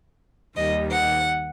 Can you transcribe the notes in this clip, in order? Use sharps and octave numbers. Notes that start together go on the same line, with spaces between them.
D#2 D#3 G3 D#5
F#5